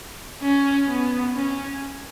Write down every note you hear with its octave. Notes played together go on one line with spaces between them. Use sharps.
C#4
B3
C#4